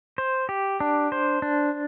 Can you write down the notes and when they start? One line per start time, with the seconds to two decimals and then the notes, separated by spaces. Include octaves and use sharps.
0.18 C5
0.49 G4
0.80 D4
1.12 C5
1.42 D4